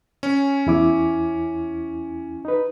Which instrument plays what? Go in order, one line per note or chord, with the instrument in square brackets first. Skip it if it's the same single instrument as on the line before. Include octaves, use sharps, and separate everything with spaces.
[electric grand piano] C#4
[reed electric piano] E2 E4 D6
D#4 B4